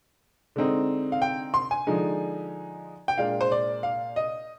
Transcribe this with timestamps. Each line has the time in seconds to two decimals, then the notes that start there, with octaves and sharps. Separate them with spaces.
0.56 D3 G#3 C4 D#4
1.12 F5
1.22 G5
1.54 C6
1.71 G#5
1.87 D3 F3 G#3 D#4
3.08 G5
3.18 A#2 G#3 D4 F5
3.41 C5
3.52 D5
3.83 F5
4.16 D#5